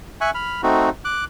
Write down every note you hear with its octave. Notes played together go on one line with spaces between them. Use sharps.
E5 G#5 C#6 F#6
B5 F6
A3 C4 D#4 F#4
D6 F#6